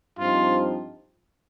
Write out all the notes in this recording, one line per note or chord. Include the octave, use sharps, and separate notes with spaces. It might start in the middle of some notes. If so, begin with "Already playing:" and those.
G2 F3 C4 D#4 F4